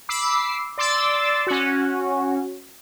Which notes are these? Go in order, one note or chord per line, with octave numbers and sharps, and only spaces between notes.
B5 D6 E6 C7
D5 C6 D6 E6 A6
C#4 F#4